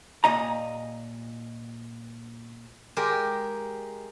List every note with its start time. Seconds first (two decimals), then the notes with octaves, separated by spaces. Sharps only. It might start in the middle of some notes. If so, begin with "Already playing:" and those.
0.24 A#2 D#5 A#5
2.97 G#3 G4 A#4